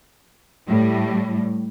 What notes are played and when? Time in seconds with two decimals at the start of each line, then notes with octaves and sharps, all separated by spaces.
0.67 A2 G3